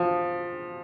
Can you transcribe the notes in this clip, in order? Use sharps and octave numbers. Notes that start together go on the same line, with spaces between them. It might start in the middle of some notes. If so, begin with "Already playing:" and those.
Already playing: F3